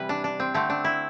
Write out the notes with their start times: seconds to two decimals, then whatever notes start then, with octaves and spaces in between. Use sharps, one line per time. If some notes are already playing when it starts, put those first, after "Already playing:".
Already playing: C3 E3 G3 B4
0.09 D4
0.24 D4
0.40 C4
0.54 D3 A3 C4
0.70 D4
0.85 E4